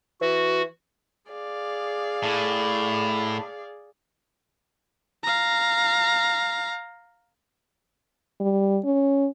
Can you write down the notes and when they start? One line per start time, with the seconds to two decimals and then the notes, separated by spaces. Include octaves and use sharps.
0.21 E3 F#4
1.32 G#4 D5 F5
2.23 A2
5.24 F5 A#5
8.40 G3
8.85 C#4